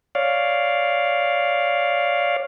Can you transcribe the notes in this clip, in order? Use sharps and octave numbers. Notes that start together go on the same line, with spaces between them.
C#5 D5 F5